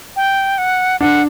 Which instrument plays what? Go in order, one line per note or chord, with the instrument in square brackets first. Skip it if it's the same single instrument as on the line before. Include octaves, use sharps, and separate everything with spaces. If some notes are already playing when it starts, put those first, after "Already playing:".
[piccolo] G5
F#5
[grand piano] D4 [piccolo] F#5